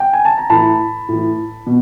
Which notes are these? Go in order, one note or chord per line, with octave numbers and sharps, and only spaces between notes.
G5
G#5
A5
A#5
A2 E3 A5 B5
A2 E3
B2